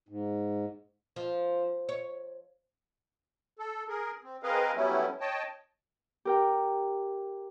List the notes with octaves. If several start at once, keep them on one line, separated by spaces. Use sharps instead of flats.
G#2
F3
C#5
A4
G#4 A#4
C4
C4 G#4 A#4 B4 D#5 F5
F#3 G3 A3 B3 C#4 E4
C#5 D#5 G5 A5
G4 A#4 G5